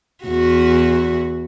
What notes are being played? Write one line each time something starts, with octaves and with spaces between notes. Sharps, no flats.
E2 F#4